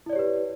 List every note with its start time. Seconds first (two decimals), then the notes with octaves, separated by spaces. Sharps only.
0.06 E4
0.10 D5
0.13 C#5
0.16 G4
0.19 B4